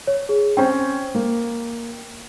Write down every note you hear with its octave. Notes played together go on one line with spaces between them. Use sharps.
C#5
G#4
C4 C#4 C5 G5
A#3